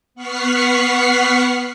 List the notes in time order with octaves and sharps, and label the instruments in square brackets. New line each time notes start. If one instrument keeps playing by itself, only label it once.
[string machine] B3 F#5 C#6 F6 B6 C7